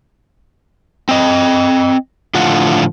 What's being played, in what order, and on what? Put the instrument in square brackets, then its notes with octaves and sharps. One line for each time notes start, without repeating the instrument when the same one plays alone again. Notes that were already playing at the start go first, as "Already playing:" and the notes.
[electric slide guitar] C4 D#5
A2 D3 F3 F4 F#5